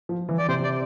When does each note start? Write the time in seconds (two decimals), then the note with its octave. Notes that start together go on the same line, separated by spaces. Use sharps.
0.09 F3
0.29 E3
0.38 D5
0.48 C3 C5
0.64 D5